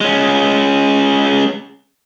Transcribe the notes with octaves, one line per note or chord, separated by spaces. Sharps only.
G#3 C#4